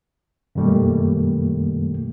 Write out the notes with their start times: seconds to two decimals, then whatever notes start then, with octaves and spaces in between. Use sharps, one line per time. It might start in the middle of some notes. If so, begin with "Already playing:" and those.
0.55 F#2 B2 D#3 G3 A3 A#3